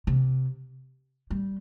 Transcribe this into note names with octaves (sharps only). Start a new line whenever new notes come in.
C3
G3